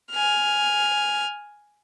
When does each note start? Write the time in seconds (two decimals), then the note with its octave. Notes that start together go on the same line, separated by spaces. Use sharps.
0.12 G#5 F6